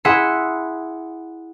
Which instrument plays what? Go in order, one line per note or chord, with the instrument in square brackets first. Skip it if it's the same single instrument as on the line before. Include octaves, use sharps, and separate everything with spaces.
[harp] E4 G#4 E5 F#5 C6